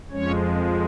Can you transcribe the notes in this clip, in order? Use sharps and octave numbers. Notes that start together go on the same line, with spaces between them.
F2 F3 G#3 C#4 C#5